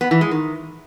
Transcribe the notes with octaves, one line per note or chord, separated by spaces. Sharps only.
B3
E3
G#3
D#3